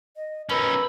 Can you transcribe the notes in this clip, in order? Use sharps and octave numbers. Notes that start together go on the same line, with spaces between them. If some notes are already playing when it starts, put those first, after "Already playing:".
D#5
B2 C#4 D#4 A#4 B5 E6